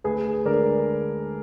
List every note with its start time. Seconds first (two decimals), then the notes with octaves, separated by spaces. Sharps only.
0.04 D2 G#4 B4
0.45 D3 G#3 A#4 D5